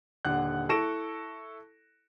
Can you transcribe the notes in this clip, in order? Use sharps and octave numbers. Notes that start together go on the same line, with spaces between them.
D#1 D3 F#5 F#6
E4 A4 C#6 A#6 D7 E7